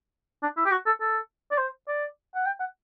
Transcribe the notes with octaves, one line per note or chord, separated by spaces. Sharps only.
D4
E4
G4
F#4
A4
A4
D5
C5
D5
F#5
G5
F#5